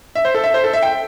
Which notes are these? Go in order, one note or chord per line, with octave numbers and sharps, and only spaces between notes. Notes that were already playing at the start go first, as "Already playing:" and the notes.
E5
C5
A4
E5
C5
A4
E5
G5